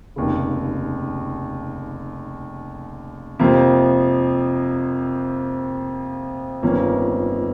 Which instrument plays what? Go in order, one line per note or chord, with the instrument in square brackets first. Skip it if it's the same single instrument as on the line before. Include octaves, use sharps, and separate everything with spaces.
[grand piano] F1 D#2 C#3
F2 C3 F3 A#3
G1 F2 D#3 A#3 C#4